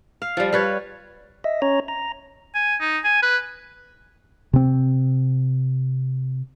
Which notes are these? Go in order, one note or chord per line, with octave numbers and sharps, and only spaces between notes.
F5
F3 G3
G3 B4 C#5
D#5 E5
C#4 C#5 A#5
A#5
G#5
D#4
G#5
B4
C3 C4